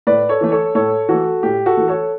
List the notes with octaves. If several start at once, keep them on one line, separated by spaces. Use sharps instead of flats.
A2 B4 D5
A4 C#5
E3 A3
A4 C#5
A2 A4 C#5
E3 A3 F#4 A4
A2 G4
F#4 A4
E3 A3
A4 C#5